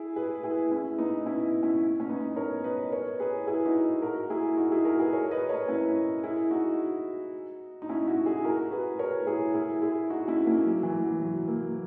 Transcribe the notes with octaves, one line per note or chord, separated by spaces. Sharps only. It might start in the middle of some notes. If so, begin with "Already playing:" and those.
Already playing: E4 G#4
G#4 B4
E4 G#4
C#4 E4
B3 D#4
C#4 E4
C#4 E4
C#4
B3 D#4
A#4 C#5
B4 D#5
A#4 C#5
G#4 B4
E4 G#4
D#4 F#4
F#4 A#4
E4 G#4
D#4 F#4
E4 G#4
F#4 A#4
G#4 B4
A#4 C#5
B4 D#5
A#4 C#5
C#4 E4
E4 G#4
D#4 F#4
D#4
C#4 E4
D#4 F#4
E4 G#4
F#4 A#4
G#4 B4
A#4 C#5
E4 G#4
E4 G#4
E4 G#4
D#4 F#4
C#4 E4
A#3 C#4
F#3
E3
F#3
F#3
F#3 A#3